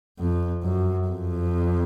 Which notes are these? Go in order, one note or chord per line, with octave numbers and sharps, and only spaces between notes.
F2
F#2
F2